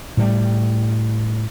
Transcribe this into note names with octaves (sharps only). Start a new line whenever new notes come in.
A2 G3 A3